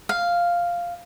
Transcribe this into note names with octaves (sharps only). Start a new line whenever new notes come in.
F5